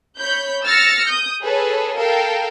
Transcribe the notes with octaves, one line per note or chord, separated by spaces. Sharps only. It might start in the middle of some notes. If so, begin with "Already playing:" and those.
C#5 B5 G6
E6 F6 A6 A#6 C#7
D#6 G6
G#4 A4 B4 C#5
A4 A#4 F5 G5